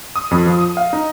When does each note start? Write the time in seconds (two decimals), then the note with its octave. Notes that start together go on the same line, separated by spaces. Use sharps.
0.16 D#6
0.31 F2
0.46 F3
0.61 D#6
0.77 F5
0.93 D#4